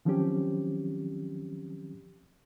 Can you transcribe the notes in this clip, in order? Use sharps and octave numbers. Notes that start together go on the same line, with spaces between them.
D#3 F3 F#3 C4 C#4 G4